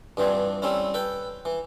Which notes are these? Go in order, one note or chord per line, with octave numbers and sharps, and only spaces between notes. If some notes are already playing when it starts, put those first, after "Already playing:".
G2 E3 F3 C4 D4
G3 A3 C4 C#4 E4
A4 B4 G5
E3